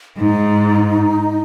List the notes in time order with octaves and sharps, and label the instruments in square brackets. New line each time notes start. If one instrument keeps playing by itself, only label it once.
[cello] G#2 [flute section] D#4